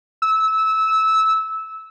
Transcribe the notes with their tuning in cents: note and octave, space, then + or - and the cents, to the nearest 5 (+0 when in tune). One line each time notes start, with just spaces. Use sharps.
E6 -20